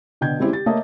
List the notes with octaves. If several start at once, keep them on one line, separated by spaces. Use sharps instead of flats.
B2 D3 G5 G6 G#6
G3 G#3 C4 C#4 E4 G4
G4 A6
A3 A#3 C#5 D#5 E5 A5